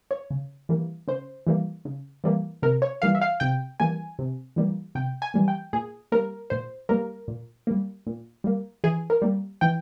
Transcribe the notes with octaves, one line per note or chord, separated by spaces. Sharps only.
C#5
C#3
E3 G3 A#3
C#3 C5
E3 G3 A#3
C#3
E3 G3 A#3
C3 A#4
C#5
E3 G3 A#3 F5
E5
F5
C3 G5
E3 G3 A#3 G#5
C3
E3 G3 A#3
C3 G5
G#5
E3 G3 A#3
G5
A#2 G#4
G3 A#3 A#4
A#2 C5
G3 A#3 A#4
A#2
G3 A#3
A#2
G3 A#3
E3 G#4
A#4
G3 A#3
E3 G5